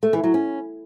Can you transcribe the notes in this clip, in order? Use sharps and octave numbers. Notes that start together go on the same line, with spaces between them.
A3
E3
F#3
C#4